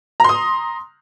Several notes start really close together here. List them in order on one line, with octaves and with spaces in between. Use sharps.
A#5 C6 D#6